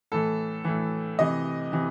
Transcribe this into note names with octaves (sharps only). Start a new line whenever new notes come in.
A2 E3 A4
A2 E3
C3 E3 D#5
C3 E3